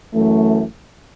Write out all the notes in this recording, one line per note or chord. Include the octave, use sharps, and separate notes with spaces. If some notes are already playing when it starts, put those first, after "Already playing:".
F#2 E3 A3